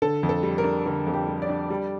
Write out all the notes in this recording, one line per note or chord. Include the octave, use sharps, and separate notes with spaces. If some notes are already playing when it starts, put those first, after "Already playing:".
D3 A4
F2
A4
G3
A#4
D4
D3 A#4
F2
G4
G3
D5
D4
G3